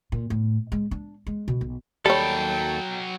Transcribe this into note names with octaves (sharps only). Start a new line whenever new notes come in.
A#2
A2
G#3
D4
G#3
B2
B1
D#2 F#3 G3 A4 C#5 G5 B5